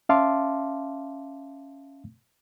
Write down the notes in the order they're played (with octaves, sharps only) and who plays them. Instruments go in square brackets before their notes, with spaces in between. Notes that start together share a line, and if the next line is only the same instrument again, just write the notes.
[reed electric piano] C#4 E5 F5 A5 C6 D6